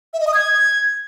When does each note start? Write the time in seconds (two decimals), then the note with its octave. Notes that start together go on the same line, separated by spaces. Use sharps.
0.13 E5
0.20 D#5
0.27 D#6
0.34 G#6